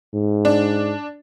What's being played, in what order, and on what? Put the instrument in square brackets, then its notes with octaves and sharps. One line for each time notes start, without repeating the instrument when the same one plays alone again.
[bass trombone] G#2
[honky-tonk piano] D4